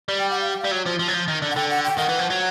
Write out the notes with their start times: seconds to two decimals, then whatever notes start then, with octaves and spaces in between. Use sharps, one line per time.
0.09 G3
0.19 G5
0.30 F#5
0.41 F5
0.50 G5
0.61 F5
0.65 G3
0.72 F#3
0.86 F3
0.99 F3
1.08 F#3
1.14 F3
1.28 D#3
1.42 D3
1.51 F#5
1.56 D3 G5
1.70 F#5
1.84 G5
1.97 D#3 F#5
2.09 E3
2.19 F3
2.30 F#3